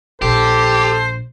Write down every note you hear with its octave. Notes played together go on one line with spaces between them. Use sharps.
A#1 G4 A4 C5